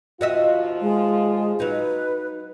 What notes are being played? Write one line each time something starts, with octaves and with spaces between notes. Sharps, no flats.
D#2 F3 F4 F#4 D#5 E5
G#3
F#3 D#4 B4